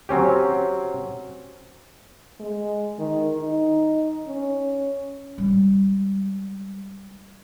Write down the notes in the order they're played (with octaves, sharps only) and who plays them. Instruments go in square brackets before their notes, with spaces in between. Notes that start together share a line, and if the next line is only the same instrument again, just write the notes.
[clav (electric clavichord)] F#3 C4 C#4 G4
[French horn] G#3
D#3
D#4
C#4
[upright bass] G3 G#3